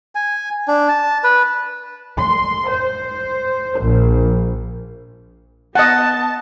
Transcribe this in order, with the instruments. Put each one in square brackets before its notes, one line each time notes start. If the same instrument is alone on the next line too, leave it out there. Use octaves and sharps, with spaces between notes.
[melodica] G#5
D4
A5
B4
[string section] C6
C5
A#1
[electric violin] B3 A5 [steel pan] D#5 F#5